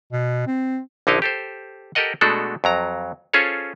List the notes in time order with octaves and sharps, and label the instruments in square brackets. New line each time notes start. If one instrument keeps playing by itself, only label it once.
[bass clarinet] B2
C4
[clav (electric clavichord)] A#1 D3 D#4 E4 D#5 F5
G4 A4 C5
G4 A4 A#4 D#5 F#5
B2 G#3 A3 D4 F#4 A4
F2 F#3 A#5
C#4 F4 G#4 A4 C5 C#5